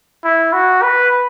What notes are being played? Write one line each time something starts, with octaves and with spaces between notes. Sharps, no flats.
E4
F#4
B4